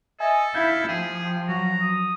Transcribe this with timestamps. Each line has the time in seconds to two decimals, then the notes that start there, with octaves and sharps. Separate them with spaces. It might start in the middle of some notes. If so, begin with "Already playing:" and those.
0.20 A4 D#5 E5 G#5
0.55 E4 F5 G6 G#6
0.89 F3 G4 G#4
1.49 F#3 F#4 A#5
1.81 D#6